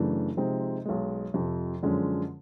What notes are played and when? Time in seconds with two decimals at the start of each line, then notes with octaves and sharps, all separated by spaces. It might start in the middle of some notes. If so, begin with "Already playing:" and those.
Already playing: F#2 C#3 E3 A3 D4
0.37 C3 F3 G#3 C4 D#4
0.85 B1 B2 G#3
1.34 F2 C3 F3
1.83 F#2 D3 F3 G#3 C#4